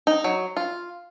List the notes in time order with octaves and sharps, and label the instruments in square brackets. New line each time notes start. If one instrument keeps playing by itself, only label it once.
[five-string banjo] D#4
F#3
F4